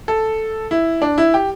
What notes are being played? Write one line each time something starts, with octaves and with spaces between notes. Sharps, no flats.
A4
E4
D4
E4
G4